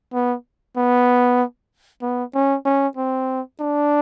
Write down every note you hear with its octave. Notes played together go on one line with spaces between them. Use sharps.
B3
B3
B3
C#4
C#4
C4
D4